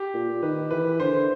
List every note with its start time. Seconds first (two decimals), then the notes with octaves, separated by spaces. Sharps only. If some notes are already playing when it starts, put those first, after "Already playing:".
Already playing: G4
0.14 A#2
0.28 A#2
0.42 D#3 B4
0.71 E3 B4
1.00 D3 C5